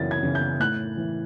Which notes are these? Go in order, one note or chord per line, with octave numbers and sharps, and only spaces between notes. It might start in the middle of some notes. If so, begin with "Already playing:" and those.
Already playing: F#2 C#3 E3 A6
G#6
C#3 E3
G6
A2 F#6
E3